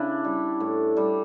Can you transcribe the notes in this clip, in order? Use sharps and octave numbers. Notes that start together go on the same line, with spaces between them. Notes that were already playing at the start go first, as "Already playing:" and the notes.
Already playing: C#3 D4 E4
G3
A2
G3